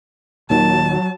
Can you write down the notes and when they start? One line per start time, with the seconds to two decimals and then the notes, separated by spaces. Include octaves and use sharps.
0.50 D#2 A#2 D#3 F#3 A5